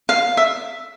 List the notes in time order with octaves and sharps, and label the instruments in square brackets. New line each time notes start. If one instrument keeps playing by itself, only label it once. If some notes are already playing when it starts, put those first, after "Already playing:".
[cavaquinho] F5
E5